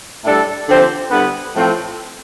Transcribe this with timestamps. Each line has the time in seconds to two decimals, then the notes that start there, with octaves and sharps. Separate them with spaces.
0.24 A2 G3 D4 A4
0.68 D3 F3 C4 G4 C5
1.11 D3 G3 B3 E4 B4
1.55 A2 F3 A3 C4